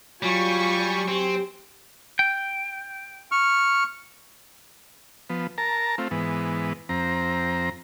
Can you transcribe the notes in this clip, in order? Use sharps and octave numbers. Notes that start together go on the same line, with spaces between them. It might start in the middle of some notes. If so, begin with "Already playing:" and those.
F#3 G3 F4 G#5 C#6
C4 G4
G5
C#6 F6
F3 B3
A#4 A5 A#5
A3 C4 F4
G#2 E3 B3
F2 C4 A#5